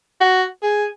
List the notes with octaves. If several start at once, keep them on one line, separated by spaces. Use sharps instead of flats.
F#4
G#4